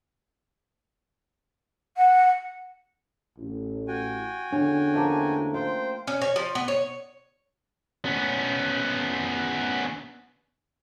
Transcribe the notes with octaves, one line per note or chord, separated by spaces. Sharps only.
F#5
A1
F#4 G5 G#5
E2 D3 C#4 D4
F3 A3 A#3
F4 C5 F5 G5
C#4
C#5
F3
B3
C#5
B3 C#4